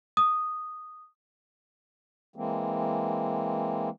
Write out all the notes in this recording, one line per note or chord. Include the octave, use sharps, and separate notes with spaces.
D#6
E3 G#3 A#3 C4